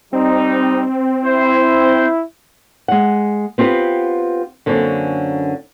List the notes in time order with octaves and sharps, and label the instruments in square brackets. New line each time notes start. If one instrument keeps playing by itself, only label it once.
[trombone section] G3 D#4 [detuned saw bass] C4
[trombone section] E4 [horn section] C5
[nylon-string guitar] G#3 F#5
B3 C4 F4 G4 B4
F#2 D3 A#3 C4 C#4 D5